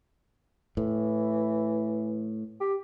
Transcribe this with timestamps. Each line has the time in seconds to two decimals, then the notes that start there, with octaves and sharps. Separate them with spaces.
0.77 A2 E3
2.61 G4